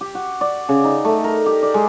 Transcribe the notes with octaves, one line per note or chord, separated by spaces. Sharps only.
G4
F#4
D5
C#3
D#4
A3
A#4
G4
D5
G#3